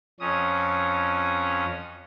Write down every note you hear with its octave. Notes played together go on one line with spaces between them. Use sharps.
F2 C#4 D#6